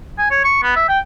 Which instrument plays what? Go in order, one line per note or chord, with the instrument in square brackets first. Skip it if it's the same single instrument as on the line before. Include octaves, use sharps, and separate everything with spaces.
[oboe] G#5
C#5
C#6
B3
E5
G5